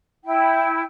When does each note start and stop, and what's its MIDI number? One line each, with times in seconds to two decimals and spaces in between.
0.24 0.81 64
0.24 0.81 79